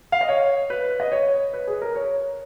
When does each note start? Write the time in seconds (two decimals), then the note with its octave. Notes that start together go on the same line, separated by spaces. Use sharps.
0.12 F5
0.21 D#5
0.29 C#5
0.70 B4
1.00 D#5
1.12 C#5
1.54 B4
1.67 G#4
1.82 A#4
1.96 C#5